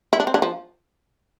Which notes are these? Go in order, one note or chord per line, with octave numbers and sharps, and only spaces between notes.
E4
D4
C4
D3 D4
F3